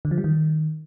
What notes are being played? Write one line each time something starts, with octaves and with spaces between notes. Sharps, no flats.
D3
F3
G3
D#3